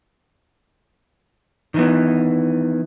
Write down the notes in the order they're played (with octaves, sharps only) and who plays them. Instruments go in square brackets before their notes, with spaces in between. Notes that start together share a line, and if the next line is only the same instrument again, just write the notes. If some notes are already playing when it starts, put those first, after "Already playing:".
[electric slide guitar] D#3 E3 B3